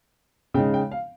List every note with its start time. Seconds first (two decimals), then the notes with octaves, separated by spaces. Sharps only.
0.54 C#3 G5
0.58 G#3 D#4
0.74 G5
0.91 F5